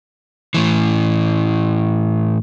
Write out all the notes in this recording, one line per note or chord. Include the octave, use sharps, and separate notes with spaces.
A2 E3